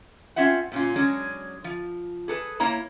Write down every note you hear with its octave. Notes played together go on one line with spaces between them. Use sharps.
C4 C#4 F4 E5 F#5
A#2 C#4 F4
F#3 G#3 C#4 D4
F3
G#4 A4 B4
A#3 E4 C#5 A#5